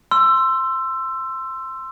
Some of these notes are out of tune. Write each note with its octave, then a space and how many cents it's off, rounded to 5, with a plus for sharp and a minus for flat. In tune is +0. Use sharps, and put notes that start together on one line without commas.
C6 +0 E6 +20